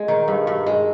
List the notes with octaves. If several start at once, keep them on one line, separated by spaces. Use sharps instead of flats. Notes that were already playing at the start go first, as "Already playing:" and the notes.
Already playing: G#3
D#3
G2
G2
G#3